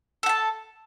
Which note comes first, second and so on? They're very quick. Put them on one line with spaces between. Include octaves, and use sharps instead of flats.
A4 F#5 A5